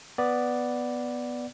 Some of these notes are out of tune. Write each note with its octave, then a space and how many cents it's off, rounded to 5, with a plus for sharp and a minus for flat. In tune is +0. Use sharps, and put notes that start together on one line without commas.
B3 +0 D5 +0